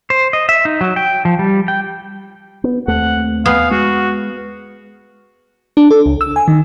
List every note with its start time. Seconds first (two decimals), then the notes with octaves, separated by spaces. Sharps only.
0.10 C5
0.33 D#5
0.49 E5
0.65 D#4
0.81 F#3
0.96 G5
1.25 F3
1.39 G3
1.68 G5
2.64 B3
2.88 D#2 A3 C4 F#5
3.46 B3 G#4 F5
3.71 G#3 F#4
5.77 D4
5.91 A4
6.06 C#2
6.21 E6
6.36 G#5
6.48 D#3